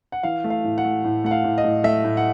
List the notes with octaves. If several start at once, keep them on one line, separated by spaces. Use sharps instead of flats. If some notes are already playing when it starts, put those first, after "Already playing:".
F#5
E3 F5
A3
F5
A2
F#5
A3
A2
A3 F#5
F5
A2
D#5
A2
A3 E5
A2
F#5